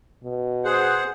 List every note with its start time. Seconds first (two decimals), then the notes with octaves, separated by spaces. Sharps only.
0.24 B2
0.65 G#4 C5 F#5